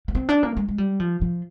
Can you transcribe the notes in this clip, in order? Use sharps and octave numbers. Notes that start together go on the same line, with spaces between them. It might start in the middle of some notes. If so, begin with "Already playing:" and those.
A#3
C4
D4
A#3
G#3
G#3
G3
F3
F3